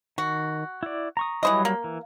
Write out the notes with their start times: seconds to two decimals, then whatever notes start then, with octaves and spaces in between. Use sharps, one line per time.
0.18 D#3 F#4
0.83 E4 D5
1.17 A#5 C#6 D#6
1.43 E3 F#3 G3 C5 D#5
1.65 A#3
1.84 E3